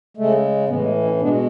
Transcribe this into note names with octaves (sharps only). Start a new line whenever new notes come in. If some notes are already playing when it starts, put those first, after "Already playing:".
C#3 G#3 A3
A2 E3 G#3 B3
G#3
C#4 E4
B2 G#3 B3 D4